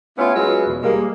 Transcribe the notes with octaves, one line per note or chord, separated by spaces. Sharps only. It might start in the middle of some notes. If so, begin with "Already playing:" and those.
A3 B3 C#4 E4 F4
F#3 G#3 C#4 F4 B4
E2 B2
G3 G#3 A#3